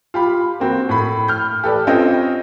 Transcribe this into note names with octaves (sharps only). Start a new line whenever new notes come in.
F4 G4 B5
A#3 C4 F#4
A2 B5
F6 G6
G4 A4 B4 D5
C4 C#4 F4 A4 D#5 G5